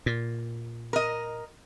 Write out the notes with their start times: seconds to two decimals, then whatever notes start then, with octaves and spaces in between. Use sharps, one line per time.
0.06 A#2
0.93 A#4 D#5